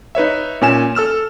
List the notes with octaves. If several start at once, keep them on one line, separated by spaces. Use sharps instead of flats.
D#4 B4 C#5 E5
A#2 C#4 G#5 E7
A4 E6 F6 E7